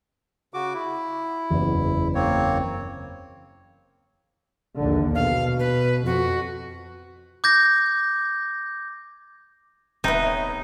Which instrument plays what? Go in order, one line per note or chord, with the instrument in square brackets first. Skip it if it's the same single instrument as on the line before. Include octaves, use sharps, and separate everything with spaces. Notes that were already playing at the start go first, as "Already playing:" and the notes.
[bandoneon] C#3 F#4 D6
E4
[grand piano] F#1 E2
[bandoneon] A#3 C4 C#5
[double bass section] A#1 D#2 D3
[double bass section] B2 [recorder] F5
[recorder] B4
[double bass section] F2 [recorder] F#4
[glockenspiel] D6 G6 G#6 A#6
[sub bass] D#1 [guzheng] C3 A3 B3 [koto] D#4 [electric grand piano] B4 G5
[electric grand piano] B4 C#5 D#5